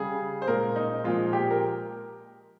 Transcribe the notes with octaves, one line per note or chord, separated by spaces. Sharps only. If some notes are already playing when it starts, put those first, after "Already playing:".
Already playing: C#3 G3 G#4
C5
A#2 G#3 A#4
D#4
A#2 F3 G#3 F4
G4
A#4